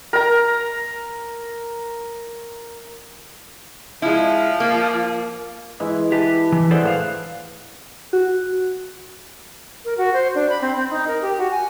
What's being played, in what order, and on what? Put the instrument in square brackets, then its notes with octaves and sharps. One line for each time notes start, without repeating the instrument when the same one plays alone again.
[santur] A#4 A#5
[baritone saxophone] F3 [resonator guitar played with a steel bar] G#3 E4
[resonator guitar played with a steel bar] A#3
[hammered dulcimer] E3 G#3 E4
[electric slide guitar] G4 [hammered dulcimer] B4 A5
[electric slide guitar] E3
[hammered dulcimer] E4 G#4 F#5 [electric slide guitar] A4 C5 D5
[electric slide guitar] A2 C5 F5
[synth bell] F#4
[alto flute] A#4
F#4
C5
D4
B5
C4
C4
D#4
A#4
G4
F#4
G#5